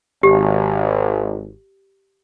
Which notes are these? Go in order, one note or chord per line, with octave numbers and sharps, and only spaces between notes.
G#1 G4